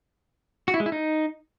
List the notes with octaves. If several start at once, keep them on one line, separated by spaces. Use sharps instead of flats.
F#4
E4
G#3
E4
D#4